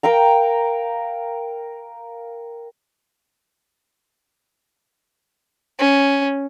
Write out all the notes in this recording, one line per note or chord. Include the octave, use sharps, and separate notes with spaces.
A#4 F5 G5 A#5
C#4